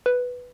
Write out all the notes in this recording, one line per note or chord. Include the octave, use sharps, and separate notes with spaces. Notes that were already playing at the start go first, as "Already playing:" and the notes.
B4